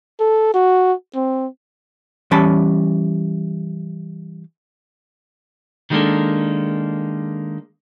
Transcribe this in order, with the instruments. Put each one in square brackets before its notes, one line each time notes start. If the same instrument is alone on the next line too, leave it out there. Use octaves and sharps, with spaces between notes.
[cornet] A4
F#4
C4
[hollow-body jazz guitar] E3 G3 C#4 A5 B5
[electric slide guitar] D#3 G3 G#3 A#3 D4 A4